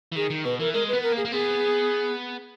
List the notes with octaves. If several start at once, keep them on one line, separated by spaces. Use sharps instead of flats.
E3
D#3 G#4
D#3
B2 B4
E3 A#4
G#3 A#4
B3 B4
A#4
A#3
G#4
A#3
B3 G#4